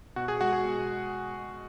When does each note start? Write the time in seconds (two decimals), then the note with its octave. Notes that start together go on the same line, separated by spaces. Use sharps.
0.16 B2 F#4 F#5
0.28 G#4 G#5
0.41 G#3 F#4 F#5
0.52 G#4 G#5
0.65 B2